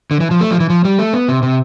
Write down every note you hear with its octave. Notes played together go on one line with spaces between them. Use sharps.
D3
E3
F3
A3
F3
E3
F3
G3
A3
B3
C3
C3